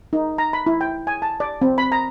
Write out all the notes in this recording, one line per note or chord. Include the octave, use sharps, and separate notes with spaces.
D#4
A#5
B5
E4
G5
G#5
A5
D5
C4
B5
A#5